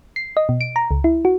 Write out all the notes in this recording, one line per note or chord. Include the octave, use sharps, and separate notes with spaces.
C7
D#5
B2
D7
A#5
C#2
E4
F#4